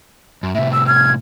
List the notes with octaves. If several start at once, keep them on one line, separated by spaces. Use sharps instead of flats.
F#2
A2 C3 E5
E6
F6 G#6